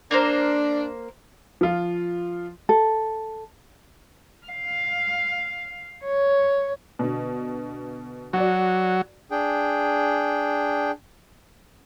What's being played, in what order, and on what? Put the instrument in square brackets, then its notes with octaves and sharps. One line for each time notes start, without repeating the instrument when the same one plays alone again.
[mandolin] A#3 A#4 C5 [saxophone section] D4
[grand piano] F3 F4
[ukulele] A4
[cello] F5
C#5
[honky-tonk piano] B2 D3
[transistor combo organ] F#3 [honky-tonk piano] F#4 D5
[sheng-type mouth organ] D4 G#4 G5